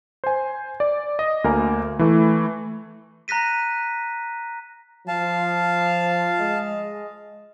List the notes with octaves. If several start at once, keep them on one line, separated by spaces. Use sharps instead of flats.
C5 G#5
D5
D#5
D2 A#3 A#4 G#5
E3 A3
A#5 F#6 A#6 B6 D#7
F3 F5 A5
G#3 D#5